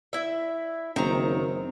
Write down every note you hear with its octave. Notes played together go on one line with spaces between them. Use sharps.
E4 E5
F#1 D#3 C4 A#5